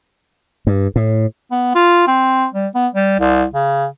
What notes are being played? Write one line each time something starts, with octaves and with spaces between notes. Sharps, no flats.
G2
A2
B3
F4
C4
G3
B3
G3
C2
C#3